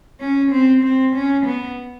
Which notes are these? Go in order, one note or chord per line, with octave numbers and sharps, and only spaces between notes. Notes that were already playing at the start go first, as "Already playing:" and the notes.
C#4
C4
C4
C#4
B3